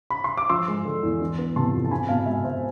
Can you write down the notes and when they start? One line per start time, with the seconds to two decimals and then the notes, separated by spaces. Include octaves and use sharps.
0.10 B5
0.24 C6
0.37 D6
0.49 F3 C6 E6
0.68 G#3
0.85 D3
1.03 E2
1.20 E3
1.38 B3
1.56 C3 A5 C6
1.74 F2
1.85 A5
1.91 C4 G#5 B5
2.09 B2 F5 A5
2.26 G#3 E5 G#5
2.45 B2 C5 E5